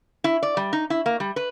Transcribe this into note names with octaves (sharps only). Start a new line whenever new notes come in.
E4
D5
G3
D#4
E4
A#3
G3
B4